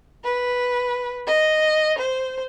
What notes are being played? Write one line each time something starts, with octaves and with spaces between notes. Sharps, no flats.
B4
D#5
C5